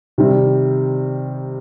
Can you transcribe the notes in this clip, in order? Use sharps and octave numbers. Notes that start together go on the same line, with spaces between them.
C3 D#3 G3 C4